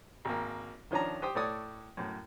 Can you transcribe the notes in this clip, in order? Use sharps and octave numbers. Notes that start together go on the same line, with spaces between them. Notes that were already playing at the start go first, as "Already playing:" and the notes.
G#1 A#3
D#3 F3 C#4 D4 A#5
G4 C5 G5 D#6
A2 A4 C#5 D5 D#6
F#2 A2